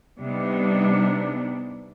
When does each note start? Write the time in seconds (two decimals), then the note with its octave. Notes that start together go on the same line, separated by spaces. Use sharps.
0.20 C3 G3 B3 D4 D#4